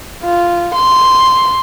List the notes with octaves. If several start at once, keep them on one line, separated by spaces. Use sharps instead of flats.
F4
C6